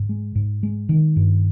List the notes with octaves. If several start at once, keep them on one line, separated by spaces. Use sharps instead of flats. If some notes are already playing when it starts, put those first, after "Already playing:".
Already playing: G#2
G#3
G#2
G#3
D#3
G2